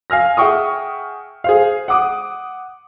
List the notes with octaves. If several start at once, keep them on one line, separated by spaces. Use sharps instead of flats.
F5 G#5 F6 A#6
G#4 E5 F#5 G5 C#6 D#6
G#4 C5 F5
F#5 D6 D#6